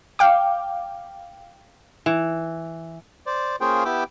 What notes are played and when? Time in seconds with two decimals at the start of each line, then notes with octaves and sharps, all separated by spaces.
0.19 F5 G5 D6
2.06 E3
3.26 C5 D5
3.61 A#3 C#4 F4 G#4 C5 G5
3.85 B3 E4 G4 G5 D6 E6